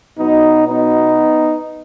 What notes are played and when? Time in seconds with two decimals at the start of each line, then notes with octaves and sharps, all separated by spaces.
0.18 B2 F#3 B3 D#4
0.67 B3 D#4